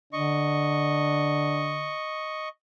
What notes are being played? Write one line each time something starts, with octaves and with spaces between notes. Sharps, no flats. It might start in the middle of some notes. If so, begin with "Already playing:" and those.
D3 D4 D#5 C#6